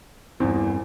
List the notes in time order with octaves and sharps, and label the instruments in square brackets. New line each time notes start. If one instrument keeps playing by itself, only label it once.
[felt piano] E2 [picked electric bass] G2 C4